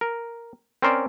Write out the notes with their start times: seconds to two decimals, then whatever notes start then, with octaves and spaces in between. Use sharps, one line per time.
0.01 A#4
0.82 C4 C#4 A#4 C5 D5